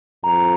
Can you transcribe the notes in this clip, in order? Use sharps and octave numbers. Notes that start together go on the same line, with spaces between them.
F2 A#5